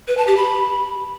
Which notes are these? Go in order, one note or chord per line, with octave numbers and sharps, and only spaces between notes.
B4
A5
G4
B5